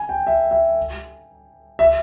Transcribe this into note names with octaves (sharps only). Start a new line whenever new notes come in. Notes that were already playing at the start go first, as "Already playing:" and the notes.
Already playing: G#5
G5
E5
E5
E5